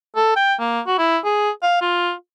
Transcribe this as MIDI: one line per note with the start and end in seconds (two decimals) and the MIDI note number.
0.16 0.32 69
0.36 0.55 79
0.60 0.80 58
0.87 0.95 66
0.98 1.18 64
1.25 1.51 68
1.63 1.78 77
1.81 2.13 65